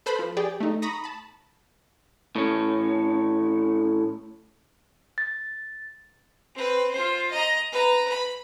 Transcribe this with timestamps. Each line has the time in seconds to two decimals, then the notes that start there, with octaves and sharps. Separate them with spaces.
0.06 A4 B4 C5 B5
0.19 F3
0.37 G4 G#4 D5 G5
0.60 A3 D#4
0.82 A#5 B5 C#6 D#6 A#6
1.04 A5 B5
2.36 A2 C#4
5.18 A6
6.55 C4 B4
6.92 F4 C5
7.31 D#5 A#5
7.72 B4 A#5
8.10 B5